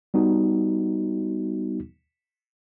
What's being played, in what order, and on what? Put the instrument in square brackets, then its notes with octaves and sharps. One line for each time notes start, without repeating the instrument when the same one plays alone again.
[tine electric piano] G3 B3 D#4 F#4